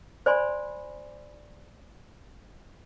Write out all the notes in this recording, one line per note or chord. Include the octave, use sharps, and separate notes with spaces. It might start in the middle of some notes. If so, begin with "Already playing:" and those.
C5 D5 G#5 B5 C6